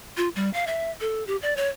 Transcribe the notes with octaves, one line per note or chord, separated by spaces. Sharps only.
F4
G3
F5
E5
A4
G4
D5
C#5